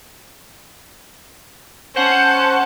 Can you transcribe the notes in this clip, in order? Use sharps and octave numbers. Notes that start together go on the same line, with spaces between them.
C#4 C5 F#5 A5